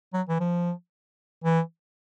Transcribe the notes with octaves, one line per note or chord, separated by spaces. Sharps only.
F#3
E3
F3
E3